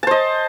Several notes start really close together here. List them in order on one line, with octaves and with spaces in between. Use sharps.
A5 C5 D#5